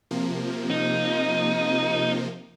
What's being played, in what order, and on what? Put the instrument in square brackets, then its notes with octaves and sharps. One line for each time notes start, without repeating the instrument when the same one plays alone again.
[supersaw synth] C3 F3 A#3
[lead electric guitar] D#4